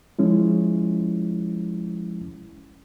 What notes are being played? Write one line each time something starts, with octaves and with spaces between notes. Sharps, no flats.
F3 G#3 C#4 E4